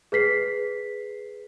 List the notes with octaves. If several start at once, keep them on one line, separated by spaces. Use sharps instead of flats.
G#4 B4 B6 C7